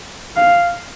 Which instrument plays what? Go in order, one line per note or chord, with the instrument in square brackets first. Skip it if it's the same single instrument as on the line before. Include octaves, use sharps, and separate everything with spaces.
[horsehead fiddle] F5